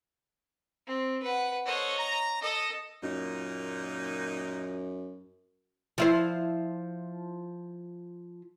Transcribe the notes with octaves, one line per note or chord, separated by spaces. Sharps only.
C4
B4 F#5
A4 C5 C#5 D#5 F#5
A#5
A4 D#5
F#2 A#2 D#4
F3 E4 C5